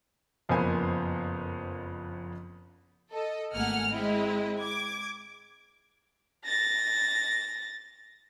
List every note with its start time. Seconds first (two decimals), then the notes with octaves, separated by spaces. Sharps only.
0.49 F#1 F2 A#3 B3 C5 G#5
3.11 A4 D#5
3.54 G#1 A3 A#3 F#5 G#5 F6
3.91 G#3 C4 E4 D#5
4.60 D6 G#6
6.44 A6 A#6